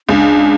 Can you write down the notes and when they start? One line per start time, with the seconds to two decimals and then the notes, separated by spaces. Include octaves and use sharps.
0.08 C#2 D4